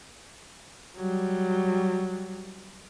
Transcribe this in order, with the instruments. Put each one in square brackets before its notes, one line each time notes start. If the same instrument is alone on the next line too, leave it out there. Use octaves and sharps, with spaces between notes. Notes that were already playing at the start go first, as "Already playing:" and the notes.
[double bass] F#3 G3